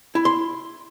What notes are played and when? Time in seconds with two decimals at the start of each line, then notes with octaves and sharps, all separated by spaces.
0.15 E4
0.25 C6